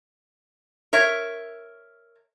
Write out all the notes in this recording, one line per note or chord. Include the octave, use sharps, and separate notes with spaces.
A#4 C#5 E5